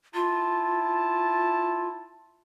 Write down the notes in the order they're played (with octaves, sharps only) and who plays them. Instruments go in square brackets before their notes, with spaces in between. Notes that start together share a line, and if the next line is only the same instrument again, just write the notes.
[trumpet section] E4 A5 [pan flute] F4